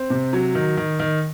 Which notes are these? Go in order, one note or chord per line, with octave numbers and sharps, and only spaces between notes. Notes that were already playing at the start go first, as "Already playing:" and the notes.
Already playing: C4
C3
F#3
D#3
D#3
D#3